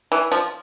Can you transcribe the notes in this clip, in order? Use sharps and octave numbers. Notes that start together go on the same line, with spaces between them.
E3
F3